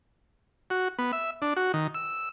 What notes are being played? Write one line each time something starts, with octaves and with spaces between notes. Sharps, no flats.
F#4
B3
E5
D4
F#4
D#3
E6